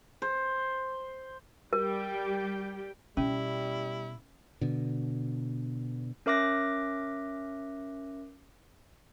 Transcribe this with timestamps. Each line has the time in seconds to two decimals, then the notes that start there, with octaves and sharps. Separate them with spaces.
0.22 C5
1.73 G3 G4 A#4 G5
3.17 B2 G3 C#4 E4
4.61 B2 D3
6.26 C#4 A#4 E5 D6 F#6 A#6